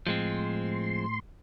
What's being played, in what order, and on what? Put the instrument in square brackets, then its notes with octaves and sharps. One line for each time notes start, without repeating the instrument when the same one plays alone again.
[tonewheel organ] A2 C6 [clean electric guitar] F3 G#3 C4